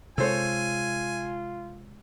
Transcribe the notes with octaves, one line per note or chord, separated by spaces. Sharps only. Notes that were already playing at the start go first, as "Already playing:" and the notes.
C3 G#3 F4 A4 C5 C#5 G#5